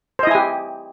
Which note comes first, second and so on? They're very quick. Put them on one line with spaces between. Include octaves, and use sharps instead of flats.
C5 D#5 E4 G#5 G4